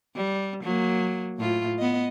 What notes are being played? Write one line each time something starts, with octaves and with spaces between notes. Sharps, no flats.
G3
F#3 A#3
A2 F4
B3 D#5